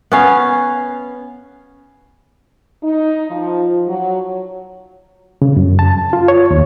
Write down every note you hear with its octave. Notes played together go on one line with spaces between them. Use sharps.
B3 C#4 F5
D#4
F3
F#3
C#3
F#2
A5
F4
C#5
D#2